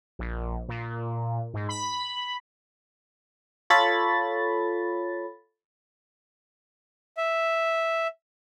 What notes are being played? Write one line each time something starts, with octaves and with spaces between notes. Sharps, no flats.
A#1
A#2
G#2
B5
F4 A4 C#5 B5 A6
E5